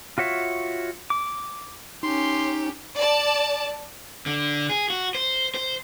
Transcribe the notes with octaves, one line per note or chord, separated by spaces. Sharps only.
F4 F#4 C#5 E5
D6
C#4 D#4 G4 C6
D5 A5
D3
G#4
F#4
C5
C5